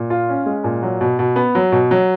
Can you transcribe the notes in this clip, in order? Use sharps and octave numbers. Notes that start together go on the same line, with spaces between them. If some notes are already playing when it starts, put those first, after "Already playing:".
Already playing: A#2
F4
C#4
G#3
A#2
F#3
B2
B2
B3
F#3
B2
F#3